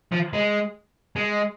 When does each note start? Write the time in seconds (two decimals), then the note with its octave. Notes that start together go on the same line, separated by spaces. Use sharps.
0.12 F3
0.33 G#3
1.16 G#3